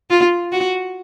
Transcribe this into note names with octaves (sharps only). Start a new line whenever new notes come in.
F4
F#4